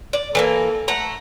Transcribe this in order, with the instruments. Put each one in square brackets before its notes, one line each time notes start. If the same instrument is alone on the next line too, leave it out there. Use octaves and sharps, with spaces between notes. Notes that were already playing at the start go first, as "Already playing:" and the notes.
[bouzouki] D5
[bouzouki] E3 G3 A#3 [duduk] A4
[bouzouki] A3 F#5 A#5